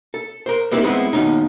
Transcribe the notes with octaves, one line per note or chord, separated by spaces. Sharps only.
A4
A#4 C5
A#3 C4 D#4 E4 G4 B4
G#3 B3 C4 E4
D#2 B2 C#4 D#4